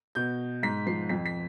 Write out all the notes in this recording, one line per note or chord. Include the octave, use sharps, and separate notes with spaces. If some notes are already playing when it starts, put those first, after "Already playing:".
B2 G6
G#2 B6
F3 C7
F2 B6
B6